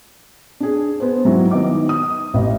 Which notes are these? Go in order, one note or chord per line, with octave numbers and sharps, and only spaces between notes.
D4 G#4
B3 C5
G#2 F#3 G3 E4
D#3 B3 D#5 D6
D#6
A1 D#5